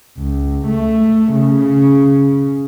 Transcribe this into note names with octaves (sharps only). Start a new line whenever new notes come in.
C#2
A3
C#3